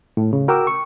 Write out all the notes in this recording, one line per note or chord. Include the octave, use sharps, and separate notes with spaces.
A2
C#3
F#4 A#4 G5 A#5 D6 E6
C#6